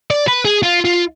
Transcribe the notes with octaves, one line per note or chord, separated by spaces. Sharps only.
D5
B4
G#4
F4
F4